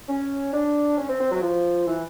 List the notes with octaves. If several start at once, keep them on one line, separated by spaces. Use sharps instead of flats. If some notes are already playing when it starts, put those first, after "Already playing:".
C#4
D4
C#4
C4
C4
F#3
F3
E3